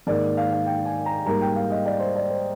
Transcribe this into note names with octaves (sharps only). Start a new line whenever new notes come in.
G#2 D#3 A#3 D5
F5
F5
G5
G#5
A#5
G#2 G3 A#3 A#5
G5
F5
D#5
D5
C5
D5
C5